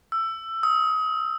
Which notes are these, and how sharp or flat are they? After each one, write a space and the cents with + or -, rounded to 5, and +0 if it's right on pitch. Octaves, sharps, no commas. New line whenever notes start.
E6 +15
D#6 +30